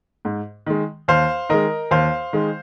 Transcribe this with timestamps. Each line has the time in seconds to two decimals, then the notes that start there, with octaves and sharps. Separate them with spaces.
0.25 G#2
0.67 D#3 G#3
1.08 D#2 C5 F5
1.49 D#3 G#3 A#4 D#5
1.91 D#2 C5 F5
2.33 D#3 G#3